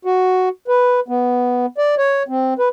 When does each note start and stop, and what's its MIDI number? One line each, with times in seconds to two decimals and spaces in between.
0.05 0.49 66
0.68 1.00 71
1.08 1.66 59
1.78 1.95 74
1.98 2.23 73
2.28 2.54 60
2.59 2.69 71